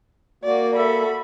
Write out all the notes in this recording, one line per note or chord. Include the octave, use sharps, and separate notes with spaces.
A#3 F#4 D5
A4 E5 B5